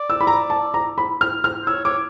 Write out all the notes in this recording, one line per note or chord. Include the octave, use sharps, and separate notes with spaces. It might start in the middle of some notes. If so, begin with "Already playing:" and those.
Already playing: D5
E6
B5
A#5
A5
A#5
B5
F6
F6
C5
C#5 E6
C#5 D6